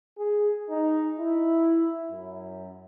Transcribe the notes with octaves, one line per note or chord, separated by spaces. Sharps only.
G#4
D#4
E4
F#2